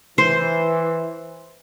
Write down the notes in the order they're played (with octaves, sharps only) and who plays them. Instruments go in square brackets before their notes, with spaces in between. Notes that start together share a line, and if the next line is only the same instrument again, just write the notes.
[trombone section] E3 [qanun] C5